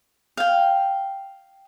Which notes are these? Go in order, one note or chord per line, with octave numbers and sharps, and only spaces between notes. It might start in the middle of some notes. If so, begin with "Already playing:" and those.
F5 G5